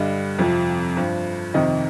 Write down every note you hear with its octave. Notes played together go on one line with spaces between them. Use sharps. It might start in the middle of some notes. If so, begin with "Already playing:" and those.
Already playing: G2 D3 G3 D#5
F2 C3 F3
G2 F3
F2 C3 D#3 D#5